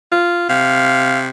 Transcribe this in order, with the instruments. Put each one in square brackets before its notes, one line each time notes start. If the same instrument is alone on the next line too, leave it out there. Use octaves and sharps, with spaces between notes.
[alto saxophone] F4
[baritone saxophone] C3 [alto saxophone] F5